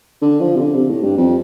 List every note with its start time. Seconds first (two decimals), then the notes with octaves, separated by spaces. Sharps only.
0.22 D3
0.40 F3
0.55 C3
0.60 D3
0.74 C3
0.89 A2
1.03 G2
1.17 F2